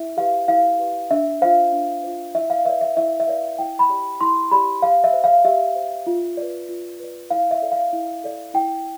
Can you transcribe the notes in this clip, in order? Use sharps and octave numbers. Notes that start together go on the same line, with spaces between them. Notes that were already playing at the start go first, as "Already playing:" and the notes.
Already playing: E4 E5
G4 B4 F5
E4 F5
G4 B4
D4 E5
F4 C5 F5
D4
F4 C5
E4 E5
F5
B4 D5 E5
E5
E4 E5
E5
B4 D5 F5
E4 G5
B5
G4 D5
E4 C6
G4 D5 B5
G4 F5
E5
C5
F5
G4 E5
C5
F4
B4 D5
F4
B4 D5
E4 F5
E5
A4 D5
F5
E4
A4 D5
E4 G5